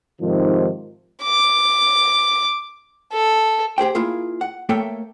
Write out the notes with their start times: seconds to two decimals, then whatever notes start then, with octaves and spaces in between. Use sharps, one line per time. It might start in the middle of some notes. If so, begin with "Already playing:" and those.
0.20 G#2 C3 D#3 F3
1.23 D6
3.13 A4
3.78 G4 G#4 C5 G5
3.95 A#3 E4 F4 G#4
4.41 F#5
4.69 A3 A#3 A4 C#5 E5 G5